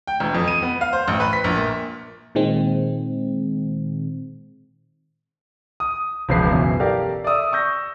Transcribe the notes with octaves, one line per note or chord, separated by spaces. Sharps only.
G5
E1
F2
D#7
B3
F5
C5
A1
B4
B6
A#1
A#2
A#2 D#3 G#3 C4
D#6
E1 C#2 F3 B4 C7
F#2 B2 E3
G4 A4 A#4 D5 F5 G5
D5 E5 D#6 E6
C#6 E6 G6 A#6